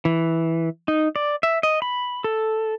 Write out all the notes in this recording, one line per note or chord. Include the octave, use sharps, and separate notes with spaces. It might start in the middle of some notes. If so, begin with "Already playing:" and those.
E3
D#4
D5
E5
D#5
B5
A4